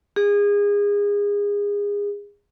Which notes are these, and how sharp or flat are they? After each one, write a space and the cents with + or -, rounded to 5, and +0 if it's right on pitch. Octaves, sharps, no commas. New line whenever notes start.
G#4 -30